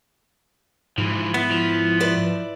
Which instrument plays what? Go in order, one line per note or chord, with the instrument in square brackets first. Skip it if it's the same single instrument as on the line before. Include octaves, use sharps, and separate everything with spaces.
[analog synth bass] G#2 [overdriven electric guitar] E3 F3
[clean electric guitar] B3 [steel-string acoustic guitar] E4
[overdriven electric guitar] F3
[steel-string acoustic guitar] B4 D5 E5